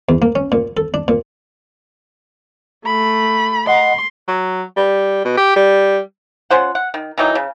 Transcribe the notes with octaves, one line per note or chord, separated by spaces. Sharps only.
E2
A#3
C#4
A#2
A4
D4
A#2
A3 B5
D#5 F#5 C6
F#3
G3
B2
G4
G3
C#4 F4 C5 F#5
F#5
D#3
D#3 E3 F#3 D#4
C#3